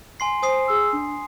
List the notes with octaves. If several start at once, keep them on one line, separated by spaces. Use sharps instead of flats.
G#5 C6 C7
C5 G#5 D#6 C7
G#4 E6
D4